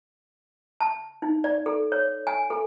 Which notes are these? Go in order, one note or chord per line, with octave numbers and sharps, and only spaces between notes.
A5
D#4
D5
A4
C#5
G#5
A4